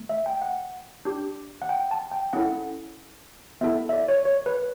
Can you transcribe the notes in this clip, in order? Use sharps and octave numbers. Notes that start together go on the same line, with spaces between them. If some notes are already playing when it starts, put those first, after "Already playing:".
Already playing: A3
E5
G5
F#5
D4 G4
F#5
G5
A5
G5
C#4 E4 A4 F#5
B3 E4 A4 E5
E5
D5
C#5
C#5
B4